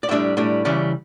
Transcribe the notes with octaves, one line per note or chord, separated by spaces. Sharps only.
D5
A2 G3 D4 E5
A2 G3 D4
C#3 E3 G3 C#4 D5